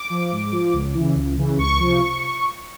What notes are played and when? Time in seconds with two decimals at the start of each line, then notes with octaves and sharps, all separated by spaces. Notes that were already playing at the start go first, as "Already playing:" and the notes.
Already playing: D6
0.10 F3
0.32 G#2
0.52 F3
0.73 C#2
0.94 C#3 E3
1.15 C#2
1.37 C#3 E3
1.58 C#2 C#6
1.79 C3 F3